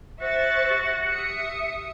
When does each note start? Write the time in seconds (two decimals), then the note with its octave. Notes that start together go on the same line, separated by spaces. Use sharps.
0.21 F#4 C5 E5 C#6 A6
0.70 G4
1.09 E5 D#6 C#7